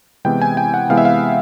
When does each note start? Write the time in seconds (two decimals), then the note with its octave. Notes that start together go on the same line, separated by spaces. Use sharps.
0.25 C3 E3 G#3 B3 E4 G5
0.42 G#5
0.57 G5
0.74 F#5
0.89 C3 E3 G#3 B3 E4 F5
0.98 E5
1.05 F5